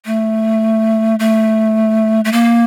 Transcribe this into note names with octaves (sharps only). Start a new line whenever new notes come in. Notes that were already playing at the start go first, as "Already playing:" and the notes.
A3
A3
A3
A#3